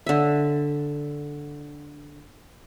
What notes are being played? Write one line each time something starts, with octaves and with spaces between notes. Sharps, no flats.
D3 E5